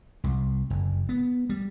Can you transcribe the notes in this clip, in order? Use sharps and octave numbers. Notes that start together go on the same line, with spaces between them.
C2
F#1
B3
G3